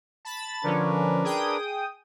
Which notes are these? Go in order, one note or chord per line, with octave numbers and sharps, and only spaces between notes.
A5 B5 A6
D3 F3 C#4 D4 A#4 B4
G#4 G5 D#6